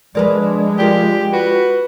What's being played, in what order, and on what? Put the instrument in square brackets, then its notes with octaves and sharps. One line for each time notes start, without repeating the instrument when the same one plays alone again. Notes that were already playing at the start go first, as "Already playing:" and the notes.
[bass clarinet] F3 [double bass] G#3 [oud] D4 A#4 B4
[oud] D4 F4 A#4 [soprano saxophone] G4
[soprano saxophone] F#4 [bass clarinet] B4